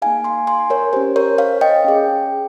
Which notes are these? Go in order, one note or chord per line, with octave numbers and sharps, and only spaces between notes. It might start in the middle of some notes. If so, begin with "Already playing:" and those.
A#3 D#4 G#4 F5 G#5
G#5 C6
G#5 C6
A#4 C#5
C#4 G4 C5
A#4 C#5
C#5 F5
D#5 G5
C#4 G#4